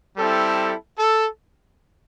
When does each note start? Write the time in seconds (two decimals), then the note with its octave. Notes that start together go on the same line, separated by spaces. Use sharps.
0.17 G3 C4 E4 A4
0.98 A4